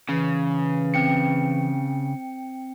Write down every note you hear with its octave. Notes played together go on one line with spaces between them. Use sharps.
C#3 E3
C4 G5 C#7